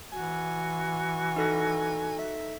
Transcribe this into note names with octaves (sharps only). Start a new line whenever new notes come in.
E3 F#4 G#5
D#4 A4 A#6
E5